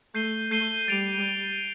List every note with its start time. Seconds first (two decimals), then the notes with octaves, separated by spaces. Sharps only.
0.14 A3 G6 C7 D#7 G7
0.51 A3 G6 C7 D#7 G7
0.88 G3 A6 D7 F7